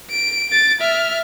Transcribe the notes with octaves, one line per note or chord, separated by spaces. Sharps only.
D7
A6 D7
E5 F6